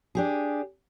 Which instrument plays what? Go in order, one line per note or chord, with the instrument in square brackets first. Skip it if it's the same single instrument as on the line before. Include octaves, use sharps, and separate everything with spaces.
[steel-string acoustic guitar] D4 G4 G#4